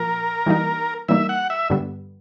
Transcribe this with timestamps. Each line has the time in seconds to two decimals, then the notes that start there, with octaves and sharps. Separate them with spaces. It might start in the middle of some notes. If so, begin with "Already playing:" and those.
Already playing: A#2 F3 A#4
0.46 E3 G3 A#3 D#4
1.08 E3 G3 A#3 D#4 E5
1.29 F#5
1.50 E5
1.70 G2 D3 G3 B3